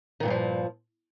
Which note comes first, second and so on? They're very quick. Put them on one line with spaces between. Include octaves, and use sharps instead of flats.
D#3 A#2 G2 F#3 F3